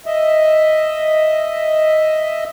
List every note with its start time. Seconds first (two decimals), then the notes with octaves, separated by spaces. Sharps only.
0.06 D#5 E5